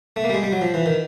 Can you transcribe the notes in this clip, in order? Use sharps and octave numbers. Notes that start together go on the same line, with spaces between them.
A3
A#3
G3
G#3
G3
F#3
F3
E3
D#3